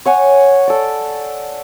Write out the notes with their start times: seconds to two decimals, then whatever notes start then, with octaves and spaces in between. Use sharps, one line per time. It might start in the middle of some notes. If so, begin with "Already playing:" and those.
0.06 C#5 F#5 G#5
0.68 A4 D5